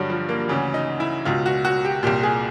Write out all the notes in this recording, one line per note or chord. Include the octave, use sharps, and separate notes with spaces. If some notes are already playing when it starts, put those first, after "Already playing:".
Already playing: G2 D3 F#3 G3
F3
A#3
D2 C#3 E3
D#4
E4
C#2 B2 F4
F#4
F#4
G4
C2 A#2 G4
G#4